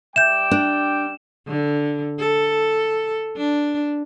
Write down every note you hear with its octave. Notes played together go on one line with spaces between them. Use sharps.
G3 E5 G5 D6 G6 E7
D4
D3
A4
D4